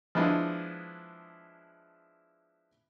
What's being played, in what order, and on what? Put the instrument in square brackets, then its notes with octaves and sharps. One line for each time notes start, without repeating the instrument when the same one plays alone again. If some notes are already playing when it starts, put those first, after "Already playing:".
[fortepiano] F3 G#3 B3 D4 E4 D#5